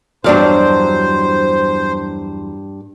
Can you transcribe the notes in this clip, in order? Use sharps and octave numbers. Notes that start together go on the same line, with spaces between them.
E2 G2 F#3 D4 C5 D5 F5